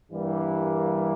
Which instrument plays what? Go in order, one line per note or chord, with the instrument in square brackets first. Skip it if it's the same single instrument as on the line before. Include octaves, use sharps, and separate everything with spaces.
[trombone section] G2 E3 G3 A#3